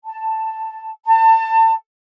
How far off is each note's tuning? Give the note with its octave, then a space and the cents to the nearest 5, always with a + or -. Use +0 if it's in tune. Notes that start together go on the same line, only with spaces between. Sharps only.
A5 +5
A5 +30